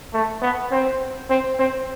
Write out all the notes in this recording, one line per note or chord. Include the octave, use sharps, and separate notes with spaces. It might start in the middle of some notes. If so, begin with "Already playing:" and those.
A3
B3
C4
C4
C4